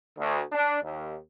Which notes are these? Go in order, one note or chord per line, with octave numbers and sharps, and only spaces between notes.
D2
D4
D#2